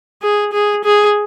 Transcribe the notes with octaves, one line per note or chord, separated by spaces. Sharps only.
G#4
G#4
G#4